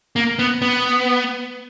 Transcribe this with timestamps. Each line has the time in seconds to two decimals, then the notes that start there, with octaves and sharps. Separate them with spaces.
0.16 A#3
0.39 B3
0.62 B3